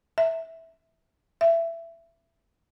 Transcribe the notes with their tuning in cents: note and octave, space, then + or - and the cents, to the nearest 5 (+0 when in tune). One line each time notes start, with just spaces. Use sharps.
E5 -10
E5 +20